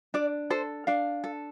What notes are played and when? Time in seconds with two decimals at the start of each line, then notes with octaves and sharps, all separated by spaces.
0.14 D4 D5
0.50 A4 C5
0.87 D4 F5
1.24 A4